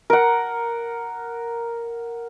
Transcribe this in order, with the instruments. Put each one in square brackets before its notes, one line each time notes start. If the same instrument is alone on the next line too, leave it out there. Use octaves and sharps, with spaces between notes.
[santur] A#4 F#5